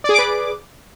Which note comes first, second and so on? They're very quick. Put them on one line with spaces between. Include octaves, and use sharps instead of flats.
D5 G#4 D6 B4